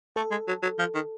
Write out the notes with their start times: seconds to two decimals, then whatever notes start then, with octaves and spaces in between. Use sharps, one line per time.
0.16 A3 A4
0.31 G#3
0.48 F#3
0.63 F#3
0.79 F3
0.95 D#3